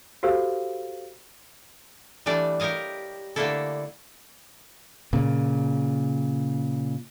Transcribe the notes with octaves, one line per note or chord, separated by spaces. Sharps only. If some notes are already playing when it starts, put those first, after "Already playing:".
F#4 G4 A4 C5 F5 E6
E3 G3 A3 D4 D5
G4 A#4 C#5 D#5 F5
D3 A3 A#3 D4 E4 A4
A#2 C#3